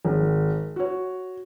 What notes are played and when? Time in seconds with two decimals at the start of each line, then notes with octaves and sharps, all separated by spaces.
0.05 G#1
0.76 F#4 C#5